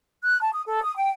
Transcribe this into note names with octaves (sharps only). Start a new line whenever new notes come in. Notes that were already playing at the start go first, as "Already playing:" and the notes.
F#6
A5
D#6
A4
D#6
G5